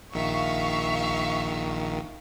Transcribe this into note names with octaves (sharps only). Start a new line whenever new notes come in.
A#1 D#3 E5 F5 C#6